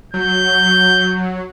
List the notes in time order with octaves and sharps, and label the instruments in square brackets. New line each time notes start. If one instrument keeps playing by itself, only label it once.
[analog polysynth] F#3 [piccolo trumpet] G6